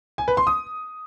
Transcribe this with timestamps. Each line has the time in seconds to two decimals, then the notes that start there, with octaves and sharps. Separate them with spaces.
0.18 G#5
0.28 B4
0.37 C6
0.47 D#6